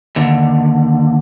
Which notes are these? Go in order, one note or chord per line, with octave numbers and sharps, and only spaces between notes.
D#2 D3